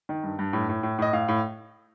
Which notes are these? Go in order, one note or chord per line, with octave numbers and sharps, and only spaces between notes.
D#3
G2
G2
A2
A2
A2
A2 D#5
A2 F5
A2